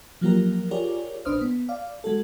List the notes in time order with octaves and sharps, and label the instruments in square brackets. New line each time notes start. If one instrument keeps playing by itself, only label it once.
[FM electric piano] F3 F#3 A#3 F4 G4 A#4
F4 G4 G#4 A#4 C#5 D5
A#1 D4 B4 C5 D#6 F6
B3
D5 F5
G#3 F#4 A4